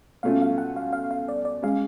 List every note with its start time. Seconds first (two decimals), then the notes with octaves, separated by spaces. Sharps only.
0.23 B2 A3 C#4 F4 F5
0.42 F5
0.58 F#5
0.76 F5
0.93 F5
1.11 F5
1.28 D5
1.45 D5
1.62 G#3 C#4 F5